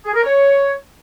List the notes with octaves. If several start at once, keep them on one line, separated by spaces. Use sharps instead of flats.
G#4
A#4
C#5